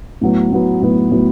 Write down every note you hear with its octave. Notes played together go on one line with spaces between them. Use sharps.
A2 F#3 B3
A2 F#3 B3
A2 F#3 B3
A2 F#3 B3